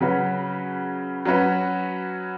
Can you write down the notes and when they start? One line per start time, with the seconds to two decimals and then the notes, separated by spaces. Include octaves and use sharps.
0.01 C#3 F#3 C#4 F#4 B4
1.25 F#3 C#4 F#4 B4